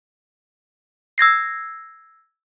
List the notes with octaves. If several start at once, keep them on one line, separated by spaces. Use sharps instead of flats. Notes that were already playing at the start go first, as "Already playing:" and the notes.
E6 G#6 A#6 C7